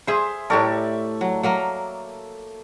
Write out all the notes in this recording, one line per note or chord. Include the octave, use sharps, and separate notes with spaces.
G#4 C5 E5 C6
A2 G4 A4 A#4 D5 C#6
F#3
F#3 A#3 A#4